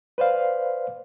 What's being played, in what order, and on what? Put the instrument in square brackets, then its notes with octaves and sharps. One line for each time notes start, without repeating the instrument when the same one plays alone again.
[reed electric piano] B4 C5 D5 F5